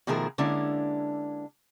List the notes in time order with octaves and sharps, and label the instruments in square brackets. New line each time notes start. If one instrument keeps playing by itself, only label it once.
[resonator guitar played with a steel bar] B2 D#3 F3 A3 G#4 A#4
D3 G#3 A#3 C#4 D4 E4